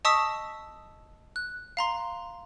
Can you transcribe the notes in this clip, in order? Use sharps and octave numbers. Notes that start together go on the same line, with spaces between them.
D#5 A5 C#6 D#6 E6 B6
F#6
F5 A#5 C6